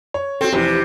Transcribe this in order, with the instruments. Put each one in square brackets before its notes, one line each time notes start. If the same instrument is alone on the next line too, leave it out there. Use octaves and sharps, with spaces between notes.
[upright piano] C#5
[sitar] C4 [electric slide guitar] F#4 A4
[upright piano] F1 E3 [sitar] C3 [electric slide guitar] G4